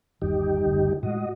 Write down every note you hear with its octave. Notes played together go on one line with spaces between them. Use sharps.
G1 D#2 G3 D#4 G4
F#1 D2
A2 G#3 F#4 D#5